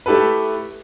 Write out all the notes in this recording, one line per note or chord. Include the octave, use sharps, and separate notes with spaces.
A3 E4 G4 A4 B4